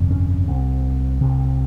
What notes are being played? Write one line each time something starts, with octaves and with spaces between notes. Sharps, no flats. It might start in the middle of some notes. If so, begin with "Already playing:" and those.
Already playing: G1 F2 C3
C#4
C2 C3
C2 C3